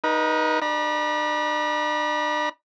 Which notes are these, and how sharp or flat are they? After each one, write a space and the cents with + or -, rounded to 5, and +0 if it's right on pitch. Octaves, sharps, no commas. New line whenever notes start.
D#4 +0 B4 -35
D4 +40 B5 -40